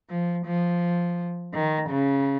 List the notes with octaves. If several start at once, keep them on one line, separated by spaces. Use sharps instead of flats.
F3
F3
D#3
C#3